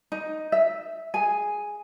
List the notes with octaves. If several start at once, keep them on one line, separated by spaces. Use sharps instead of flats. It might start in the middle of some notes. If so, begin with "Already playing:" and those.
D#4
E5
G#4 G#5